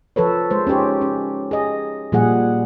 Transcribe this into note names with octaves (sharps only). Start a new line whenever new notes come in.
F3 A4 B4 C#5
G#3 C5
C#4 D#4 G4 C#5
C#4
G#4 D#5
A#2 F3 G3 G#4 F#5